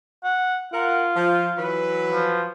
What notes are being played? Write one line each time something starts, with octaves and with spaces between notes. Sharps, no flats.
F#5
F4 A#4 F#5
F3
E3 F#3 B4
F3